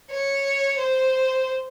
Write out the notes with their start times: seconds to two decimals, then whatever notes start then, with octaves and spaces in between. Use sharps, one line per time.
0.10 C#5
0.79 C5